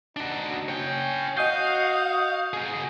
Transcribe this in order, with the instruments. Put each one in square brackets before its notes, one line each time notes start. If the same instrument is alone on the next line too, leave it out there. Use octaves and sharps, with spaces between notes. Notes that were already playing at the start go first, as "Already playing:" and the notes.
[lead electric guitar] D4 F#4 [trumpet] D#4
[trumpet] C#4 [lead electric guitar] C#5 G5
[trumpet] F#4 [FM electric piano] D#5 D#6 G6 [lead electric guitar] F5
[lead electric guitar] F#4 G#4